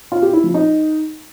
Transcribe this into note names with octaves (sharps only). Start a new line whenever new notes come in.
F4
G4
E4
F3
D#4